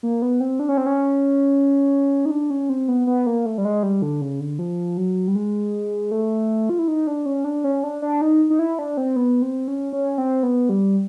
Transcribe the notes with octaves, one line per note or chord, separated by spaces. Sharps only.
A#3
B3
C4
D4
C#4
C4
C#4
D#4
D4
C#4
C4
B3
B3
A#3
A3
G3
G#3
G3
D3
C#3
D3
F3
F#3
G3
G#3
A3
F4
E4
D#4
D4
C#4
D4
C#4
D4
D4
D#4
D#4
E4
D4
C4
B3
C4
C#4
C#4
C4
B3
G3